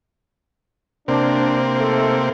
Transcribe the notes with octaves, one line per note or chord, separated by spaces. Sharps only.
C3 A#3 C4 D4
A3 D#4 A4